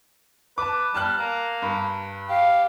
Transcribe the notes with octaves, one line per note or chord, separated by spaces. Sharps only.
B4 A5 D6
G3 A5 F6 F#6
A#3
G2
G4 F5